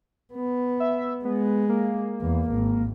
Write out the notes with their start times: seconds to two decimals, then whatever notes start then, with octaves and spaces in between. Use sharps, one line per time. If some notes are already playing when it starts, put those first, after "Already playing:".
0.34 B3
0.80 E5
1.25 G#3 B3
1.69 A#3
2.21 E2
2.52 G#1